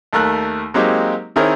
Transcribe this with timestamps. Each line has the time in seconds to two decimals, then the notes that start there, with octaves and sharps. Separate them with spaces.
0.13 D#2 A3 A#4 F#6
0.74 F#3 G#3 A#3 C4 D#4 G4
1.36 D#3 C4 E4 G#4 A#4 C#5